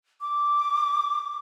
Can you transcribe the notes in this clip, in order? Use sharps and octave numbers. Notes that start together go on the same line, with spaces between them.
D6